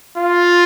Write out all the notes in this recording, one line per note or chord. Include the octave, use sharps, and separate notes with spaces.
F4